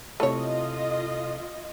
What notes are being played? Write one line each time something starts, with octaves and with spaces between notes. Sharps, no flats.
C3 A3 E4 F4 A4 C#5 D#5